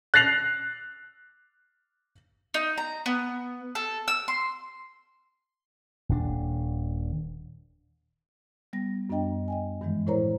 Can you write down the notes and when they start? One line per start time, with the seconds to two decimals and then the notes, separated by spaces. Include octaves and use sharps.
0.14 F#6 A6 A#6 C7 F7 F#7
2.54 D#4
2.78 A#5
3.06 B3
3.75 A4
4.08 E6
4.28 C6
6.09 D#1 D4
8.73 G3 B3 A#6
9.10 F#2 B3 D4 D#5 G5
9.48 D#5 G5 G#5
9.81 G2 D#3 E3 G#3
10.07 A2 E4 A#4 C5 C#5 A#5